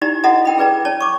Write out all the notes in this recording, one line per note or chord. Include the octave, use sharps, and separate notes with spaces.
D#4 E4 G4 D5 A#5
E4 F#4 A4 D#5 F#5 A#5
A#4 G5 B5
E4 G#4 B4 D5 A#5
C#5 D5 A5
C#6 D6